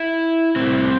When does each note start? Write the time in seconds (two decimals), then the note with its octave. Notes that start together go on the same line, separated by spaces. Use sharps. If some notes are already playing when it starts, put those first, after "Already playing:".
Already playing: E4
0.56 A2 C4
0.61 G3